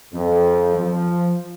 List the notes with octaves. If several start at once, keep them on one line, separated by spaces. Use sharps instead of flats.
F2
F3